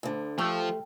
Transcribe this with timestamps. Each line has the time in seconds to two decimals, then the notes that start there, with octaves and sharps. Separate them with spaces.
0.03 D2 D3
0.38 F3 A3 G4 A4 G5